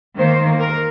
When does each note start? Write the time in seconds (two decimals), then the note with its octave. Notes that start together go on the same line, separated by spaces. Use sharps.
0.17 D#3 A#3 C5
0.60 A#4